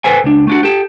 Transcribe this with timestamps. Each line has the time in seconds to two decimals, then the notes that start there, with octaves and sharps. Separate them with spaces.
0.04 A4 B4 C5 G#5
0.24 C#2 D4
0.47 A3 D4 F#4
0.63 G4 A4